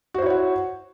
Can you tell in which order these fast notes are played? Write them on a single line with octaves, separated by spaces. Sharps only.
F#4 C5 E4 C#5 F#5